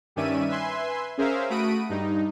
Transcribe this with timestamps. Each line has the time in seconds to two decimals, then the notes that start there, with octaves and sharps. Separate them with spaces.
0.16 G2 D#3 C#4 D5 E5 D#7
0.48 B4 E5 G#5 C6
1.18 C#4 G#4 A#4 C5 E5 F5
1.50 A3 F#4 B5 D#6 D7 D#7
1.89 G2 D#4